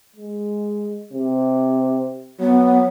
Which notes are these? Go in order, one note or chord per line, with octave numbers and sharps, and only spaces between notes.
G#3
C3
F#3 B3